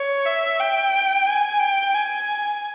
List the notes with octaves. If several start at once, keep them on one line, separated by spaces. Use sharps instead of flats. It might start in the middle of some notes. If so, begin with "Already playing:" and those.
Already playing: C#5
E5
G5
G#5
G5
G#5